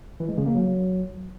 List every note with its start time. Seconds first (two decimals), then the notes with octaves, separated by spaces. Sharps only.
0.20 E3
0.29 G#3
0.38 C#3
0.46 A#3
0.55 F#3